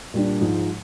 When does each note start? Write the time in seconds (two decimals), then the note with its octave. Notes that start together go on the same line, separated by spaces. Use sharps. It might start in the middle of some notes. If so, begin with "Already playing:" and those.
0.14 A#2 G3 D4
0.41 G#2 F3 G#3